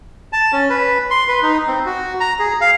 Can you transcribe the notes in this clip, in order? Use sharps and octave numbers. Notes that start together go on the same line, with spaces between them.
A5
C#4
B4
C6
B4
D#4
C4
F#4
A#5
G#4
F5